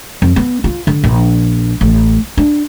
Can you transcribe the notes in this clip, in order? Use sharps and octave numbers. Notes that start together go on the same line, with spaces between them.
F2
B3
F4
D3
A#1
A1
D4